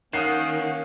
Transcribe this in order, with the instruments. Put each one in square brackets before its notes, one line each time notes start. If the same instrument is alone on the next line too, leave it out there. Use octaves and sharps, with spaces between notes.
[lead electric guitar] D#3 [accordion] A#3 C#4 [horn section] F#5 [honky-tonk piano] D#6 C7